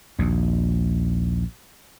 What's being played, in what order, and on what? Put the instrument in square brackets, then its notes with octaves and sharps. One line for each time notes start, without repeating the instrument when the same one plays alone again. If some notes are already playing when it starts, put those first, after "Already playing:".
[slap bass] A#1 D#2